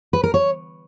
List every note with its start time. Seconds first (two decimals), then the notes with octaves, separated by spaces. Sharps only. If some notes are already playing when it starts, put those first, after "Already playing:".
0.13 B4
0.24 A#4
0.34 C#5